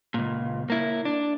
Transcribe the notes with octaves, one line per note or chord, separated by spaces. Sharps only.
C#2 A#2
A#3 E4
D4